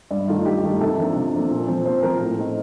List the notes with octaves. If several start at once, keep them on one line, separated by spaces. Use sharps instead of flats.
G2 D5
D#3 A3 D#4 F4
G2 G4
D#3 A3 D#4
C3 A4
F3 A#3 D4
C3
F3 A#3 D4
A#2
F3 C4
A#2 C5
F3 C4 A#4
A2
A3 C4 D#4